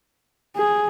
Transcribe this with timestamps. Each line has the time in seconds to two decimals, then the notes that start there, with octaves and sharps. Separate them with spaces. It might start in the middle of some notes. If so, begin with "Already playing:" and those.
0.56 G#4